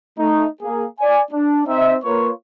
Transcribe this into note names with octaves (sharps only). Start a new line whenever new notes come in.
A3 D#4
A#3 G#4
D5 G#5
D4
C4 D#4 E5
A#3 F4 A#4 B4 C#5